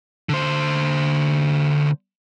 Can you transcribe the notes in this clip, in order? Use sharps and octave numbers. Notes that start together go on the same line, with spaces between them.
D3 C5